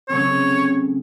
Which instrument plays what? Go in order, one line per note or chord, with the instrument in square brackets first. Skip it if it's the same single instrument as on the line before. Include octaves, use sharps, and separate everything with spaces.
[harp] C#3 F#3 A3 C4 [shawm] C#5